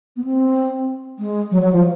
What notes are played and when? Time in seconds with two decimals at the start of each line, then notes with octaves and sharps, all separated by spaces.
0.16 B3
0.24 C4
1.19 G#3
1.52 F#3
1.62 F#3
1.73 F3